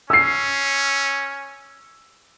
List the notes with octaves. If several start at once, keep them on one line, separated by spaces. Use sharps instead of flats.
C#4 E6 C7